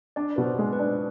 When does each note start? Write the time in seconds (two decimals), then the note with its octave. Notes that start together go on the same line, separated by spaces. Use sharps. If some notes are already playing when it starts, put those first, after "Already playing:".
0.16 D4 D5
0.36 B2 B4
0.44 C5
0.59 G#3
0.73 B4
0.79 D4